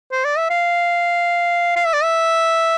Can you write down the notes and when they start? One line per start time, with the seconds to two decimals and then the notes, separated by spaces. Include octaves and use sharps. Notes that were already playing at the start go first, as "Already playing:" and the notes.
0.12 C5
0.25 D5
0.38 E5
0.50 F5
1.76 F5
1.85 E5
1.93 D5
2.03 E5